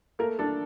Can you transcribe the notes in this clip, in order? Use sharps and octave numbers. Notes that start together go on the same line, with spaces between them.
A3 A#3 A#4
D4 A4